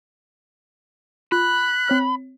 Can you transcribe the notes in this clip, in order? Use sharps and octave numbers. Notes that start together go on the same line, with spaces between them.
F4 B5 F#6
C4 C#5 F6